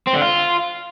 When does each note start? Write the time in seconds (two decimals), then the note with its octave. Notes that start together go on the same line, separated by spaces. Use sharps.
0.07 C4
0.14 D3
0.22 F4